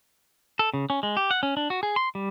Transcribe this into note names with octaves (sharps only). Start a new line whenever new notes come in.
A4
C#3
C#4
G#3
G4
F#5
C#4
D4
F#4
G#4
C6
G3